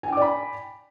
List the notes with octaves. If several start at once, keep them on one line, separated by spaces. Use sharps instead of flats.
D5 G5 G#5 B5 D6